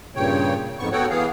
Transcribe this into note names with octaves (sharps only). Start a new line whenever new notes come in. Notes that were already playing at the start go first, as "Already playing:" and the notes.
G2 A#2 C#3 C#5 G5
F2 G#2 B3 C#6
B3 F#4 A4 C#5 F#5 G5
E3 B3 G#4 F5